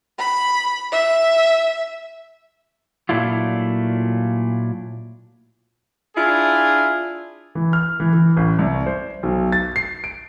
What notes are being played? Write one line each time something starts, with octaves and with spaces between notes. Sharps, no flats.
B5
E5
A#2 F#3 A3 D4 E4 F4
D4 E4 F4 G#4
E3
F6
E3
E3
A1
C2
C5
B1
A6
C7
D7